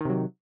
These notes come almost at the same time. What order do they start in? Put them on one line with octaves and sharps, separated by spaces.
D#3 C3 F#3